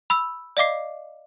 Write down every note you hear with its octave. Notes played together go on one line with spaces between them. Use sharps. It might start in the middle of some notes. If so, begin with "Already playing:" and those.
B5 E6
D5 D#5 F5 D6 C7